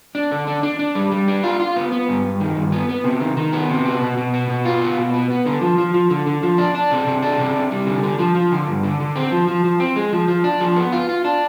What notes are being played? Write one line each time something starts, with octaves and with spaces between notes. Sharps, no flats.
D4
D3
D4
D4
D4
G3
G3
D4
F4
F4
B3
B3
G2
G2
D#3
G2
B3
B3
C3
D#3
D#3
B3
C3
B3
B2
B2
B3
B2
F4
B3
B2
B3
B3
D3
F3
F3
F3
D3
D3
F3
D4
D4
C3
C3
D4
C3
C3
G3
D3
D3
F3
F3
D3
G2
D3
D3
C4
F3
F3
F3
C4
G#3
F3
F3
D4
F3
B3
F4
F4
D4